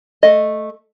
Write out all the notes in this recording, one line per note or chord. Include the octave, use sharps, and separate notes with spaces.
A3 D#5